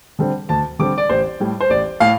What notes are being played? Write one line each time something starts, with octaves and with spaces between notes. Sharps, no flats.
D3 G3 C4
D2 A5
D3 G3 C4 D6
D5
A1 C5
A2 G3
C5
A1 D5
A2 F5